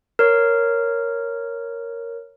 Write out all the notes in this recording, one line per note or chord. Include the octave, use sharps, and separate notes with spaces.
A#4 C#5